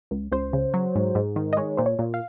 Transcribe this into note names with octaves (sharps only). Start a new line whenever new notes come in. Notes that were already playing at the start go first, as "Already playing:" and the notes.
C#2
C#2 C5
C#3
F#3
G#2
G#2
D#3
D#5
G#3 C#5
A#2 C5
C#5
A#2
F5